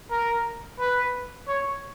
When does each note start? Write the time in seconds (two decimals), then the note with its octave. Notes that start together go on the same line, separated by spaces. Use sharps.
0.11 A#4
0.79 B4
1.48 C#5